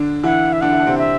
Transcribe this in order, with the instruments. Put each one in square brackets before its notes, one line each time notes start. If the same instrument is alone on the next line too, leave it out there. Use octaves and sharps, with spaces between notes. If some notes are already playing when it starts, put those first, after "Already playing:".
Already playing: [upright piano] D3 D4
[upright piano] E3 E4 [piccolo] F#5
[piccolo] E5
[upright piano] D3 D4 [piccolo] F#5
[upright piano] E4
D4
C3 C4
[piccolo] E5